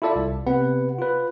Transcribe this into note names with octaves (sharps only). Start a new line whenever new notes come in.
E4 F4 A4 D5 E5
C2
C3 B3 B4 F#5
F4 B4